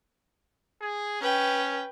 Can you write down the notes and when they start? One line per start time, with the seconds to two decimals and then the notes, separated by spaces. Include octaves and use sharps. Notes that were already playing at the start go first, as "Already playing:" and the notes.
0.81 G#4
1.21 C#4 B4 G5